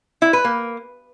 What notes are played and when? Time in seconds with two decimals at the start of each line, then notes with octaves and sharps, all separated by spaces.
0.22 E4
0.33 B4
0.45 A#3